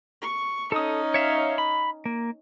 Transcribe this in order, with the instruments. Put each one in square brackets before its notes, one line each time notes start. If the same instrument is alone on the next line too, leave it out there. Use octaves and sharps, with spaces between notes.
[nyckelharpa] C#6
[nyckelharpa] C#4 D#4 [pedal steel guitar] A4 D#6
[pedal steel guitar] C#5 E5 F5
B5
A#3